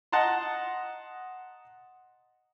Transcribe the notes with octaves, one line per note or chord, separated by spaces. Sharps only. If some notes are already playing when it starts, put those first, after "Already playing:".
D#5 F#5 A5 A#5 C6